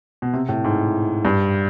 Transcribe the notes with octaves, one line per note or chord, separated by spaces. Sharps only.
B2
C3
A2
G#2
G2